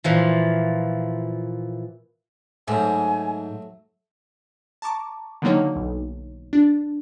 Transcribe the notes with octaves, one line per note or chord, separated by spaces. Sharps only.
A#2 E3 F3
G#2 F#3 A3 G#5
A5 A#5 C#6 D6
D3 D#3 F#3 A#3 D#4 C#5
B1
D4